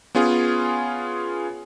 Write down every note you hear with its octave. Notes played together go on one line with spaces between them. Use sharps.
B3 C#4 F4 G#4